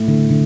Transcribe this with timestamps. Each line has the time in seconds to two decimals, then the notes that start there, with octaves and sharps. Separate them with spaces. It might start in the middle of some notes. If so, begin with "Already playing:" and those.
Already playing: A2
0.08 D3
0.31 D3